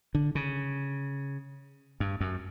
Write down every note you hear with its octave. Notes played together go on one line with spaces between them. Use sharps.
D3
C#3
G2
F#2